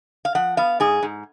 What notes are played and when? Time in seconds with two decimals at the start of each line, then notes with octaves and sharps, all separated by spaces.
0.25 F5
0.35 F3 F#5
0.57 B3 F5
0.80 G#2 G#4
1.03 G#2